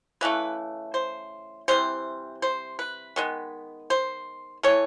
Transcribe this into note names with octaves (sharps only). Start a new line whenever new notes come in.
C#3 E3 A3 B4
C5
C3 E3 G3 C5
C5
B4
D#3 G#3 B3
C5
E3 A3 C#5